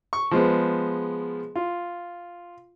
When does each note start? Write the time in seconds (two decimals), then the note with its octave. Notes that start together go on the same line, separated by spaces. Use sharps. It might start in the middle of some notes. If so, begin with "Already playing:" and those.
0.13 C#6
0.31 F3 G#3 B3
1.56 F4